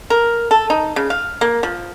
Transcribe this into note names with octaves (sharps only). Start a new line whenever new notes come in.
A#4
A4
D#4
C#3
F5
A#3
F3